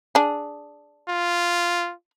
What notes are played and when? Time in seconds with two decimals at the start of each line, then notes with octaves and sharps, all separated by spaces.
0.15 D4 G#4
1.10 F4